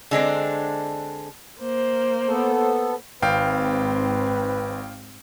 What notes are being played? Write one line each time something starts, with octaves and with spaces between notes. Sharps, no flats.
D3 G#3 C4 D4
A#3 C5
B3 A4
G#1 G#2 C4 B4 F5 G5